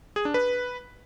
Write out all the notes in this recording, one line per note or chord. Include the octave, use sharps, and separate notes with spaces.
G#4
D4
B4